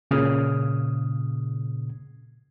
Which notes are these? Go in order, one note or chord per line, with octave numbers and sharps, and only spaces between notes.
A#2 C#3 D#6 F6